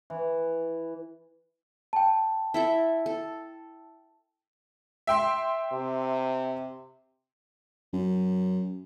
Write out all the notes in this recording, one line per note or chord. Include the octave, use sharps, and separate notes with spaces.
E3
G5 A5
E4 A4 E5
A4
E5 G5 C6
C3
F#2